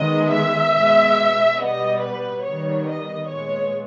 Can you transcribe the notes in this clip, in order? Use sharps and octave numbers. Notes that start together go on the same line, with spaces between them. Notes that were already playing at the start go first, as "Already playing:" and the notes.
Already playing: D#3 G#3 B3 D#5
E5
B2 G#3 B3
B2 G3 B3 D#5
B4
D#3 G3 B3 C#5
D#5
A#2 G#3 B3 C#5